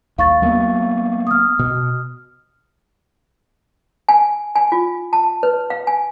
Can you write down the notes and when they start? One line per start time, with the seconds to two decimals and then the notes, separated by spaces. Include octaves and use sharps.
0.18 D#2 F5 C#6 A6
0.42 F#3 A#3 B3
1.27 D#6 F6
1.59 B2
4.09 G#5
4.55 G#5
4.72 F4
5.13 A5
5.43 B4
5.70 F5
5.87 G#5